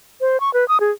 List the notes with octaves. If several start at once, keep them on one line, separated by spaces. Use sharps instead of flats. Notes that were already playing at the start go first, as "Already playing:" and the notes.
C5
C#6
B4
D#6
G#4